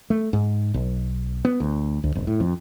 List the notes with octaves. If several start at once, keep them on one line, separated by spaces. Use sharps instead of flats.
A3
G#2
B1
B3
D2
D2
F1
A2
F2